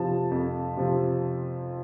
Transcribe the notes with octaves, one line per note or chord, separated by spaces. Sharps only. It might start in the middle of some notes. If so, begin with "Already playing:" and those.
Already playing: F2 C3 F3 A5
F2
C3 F3